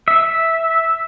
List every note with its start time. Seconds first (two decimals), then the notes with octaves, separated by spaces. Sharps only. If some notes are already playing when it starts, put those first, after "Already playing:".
0.08 E5